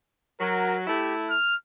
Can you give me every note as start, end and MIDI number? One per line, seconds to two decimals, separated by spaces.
0.40 0.86 54
0.40 0.77 70
0.87 1.33 57
0.87 1.33 64
0.87 1.14 67
1.30 1.56 89